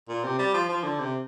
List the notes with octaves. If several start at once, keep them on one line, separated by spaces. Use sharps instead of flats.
A#2
C3
G3
F3
F3
D3
C3